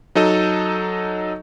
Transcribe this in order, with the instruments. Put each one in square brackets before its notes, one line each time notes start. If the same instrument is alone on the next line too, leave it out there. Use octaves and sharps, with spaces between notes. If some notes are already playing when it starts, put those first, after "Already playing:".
[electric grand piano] F#3 D#4 A4 D#5